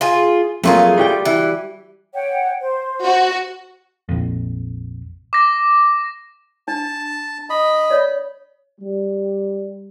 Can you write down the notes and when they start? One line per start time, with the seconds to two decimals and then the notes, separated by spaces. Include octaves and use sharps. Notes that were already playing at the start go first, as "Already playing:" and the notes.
0.01 F4 G#4
0.64 F2 F#3 A3 A#3 F4 G#4
0.98 G3 F#4 G5
1.25 E3
2.14 C#5 F#5 G5
2.60 C5
3.04 F#4
4.09 A#1 F2
5.33 D6 A#6
6.68 D4 A5
7.50 D#5 B5
7.90 C#5 D5
8.81 G3